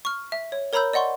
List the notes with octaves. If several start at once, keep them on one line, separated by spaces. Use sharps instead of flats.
C#6 F6
E5
C#5
A#4 C#5 A#5 B5 E6 G6
D5 D#5 F#5 C6 C#6